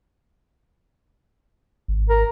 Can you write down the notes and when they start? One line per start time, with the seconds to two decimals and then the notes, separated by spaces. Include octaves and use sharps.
1.88 G#1
2.09 A#4